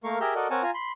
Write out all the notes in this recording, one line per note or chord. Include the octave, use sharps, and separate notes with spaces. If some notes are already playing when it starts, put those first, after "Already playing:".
A3 A#3 A#4 F5 C#6
G4 G#4 A#4 E5 A#5 G6
F#4 A4 A#4 D5 D#5
C4 A#4 C#5 F#5 G#5 A5
F4 G#5 A#5
B5 C6